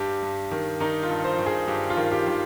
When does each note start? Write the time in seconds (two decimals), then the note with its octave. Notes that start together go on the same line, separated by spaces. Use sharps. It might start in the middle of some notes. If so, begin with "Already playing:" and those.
Already playing: G2 G4
0.23 G2
0.51 D#3
0.80 D#3 D#4
1.03 F4
1.09 G2
1.24 C5
1.39 D#3
1.46 G#4
1.68 G2 G4
1.90 F4
1.97 D#3
2.12 G4
2.27 D#3